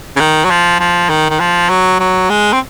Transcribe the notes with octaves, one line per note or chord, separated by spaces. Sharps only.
C#3
D#3
F#3
F3
F3
D#3
D#3
F3
F#3
F#3
G#3
C4